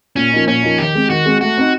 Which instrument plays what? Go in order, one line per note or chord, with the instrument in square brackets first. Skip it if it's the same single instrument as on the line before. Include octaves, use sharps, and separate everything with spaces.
[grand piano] A#2 [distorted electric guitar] C#4
[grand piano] F3 A#3 D#4
[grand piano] A#2 [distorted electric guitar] C#4
[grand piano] F3 A#3 D#4
[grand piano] D#3 [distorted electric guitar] G4
[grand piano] G#3 C4
[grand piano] D#3 [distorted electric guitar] F#4
[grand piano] G#3 C4
[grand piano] A3 [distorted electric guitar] F#4
[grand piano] C4 D#4